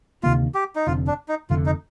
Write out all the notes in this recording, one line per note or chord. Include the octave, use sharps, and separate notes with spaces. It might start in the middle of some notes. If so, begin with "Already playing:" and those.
D2 C3 D#3 A#3 F4
G4
D#4
F1 F2 D3 F4
D4
D#4
F1 F2 D3 A3 F4
D#4